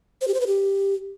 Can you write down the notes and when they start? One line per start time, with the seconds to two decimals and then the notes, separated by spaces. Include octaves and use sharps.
0.21 C5
0.28 G4
0.34 C5
0.40 B4
0.47 G4